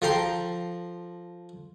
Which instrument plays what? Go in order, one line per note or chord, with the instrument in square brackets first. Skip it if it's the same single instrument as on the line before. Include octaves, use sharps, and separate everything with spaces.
[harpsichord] F3 A4 G5 A#5 C6